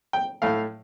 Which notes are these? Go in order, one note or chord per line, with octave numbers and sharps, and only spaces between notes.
G5
A2 A3 F5